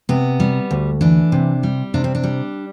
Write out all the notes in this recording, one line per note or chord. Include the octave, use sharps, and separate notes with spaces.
C3 B3
G3
D2
E3 D4
C3
G3
C3 D4
C4
D4
G3